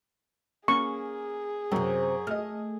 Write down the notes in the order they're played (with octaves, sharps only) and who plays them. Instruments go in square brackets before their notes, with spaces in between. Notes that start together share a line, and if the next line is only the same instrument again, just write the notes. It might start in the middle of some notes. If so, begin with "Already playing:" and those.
[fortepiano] A#3 C#4 [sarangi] G#4 [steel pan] C#6
[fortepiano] F#2 [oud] C3 C4
[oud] A3 [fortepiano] D#5 F6